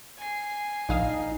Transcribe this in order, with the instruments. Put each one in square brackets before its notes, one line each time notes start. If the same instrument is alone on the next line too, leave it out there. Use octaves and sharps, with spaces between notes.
[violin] G#5 C7
[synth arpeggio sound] A#1 F5 D#6 [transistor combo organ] D#4